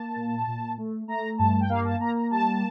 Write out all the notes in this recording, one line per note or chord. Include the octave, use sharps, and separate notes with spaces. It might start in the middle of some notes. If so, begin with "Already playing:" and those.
Already playing: A#3 A5
A#2
A#2
A3
A3 A#5
G2 A5
G5
A#3 F5
A5
A#3 A#5
A#5
G3 A5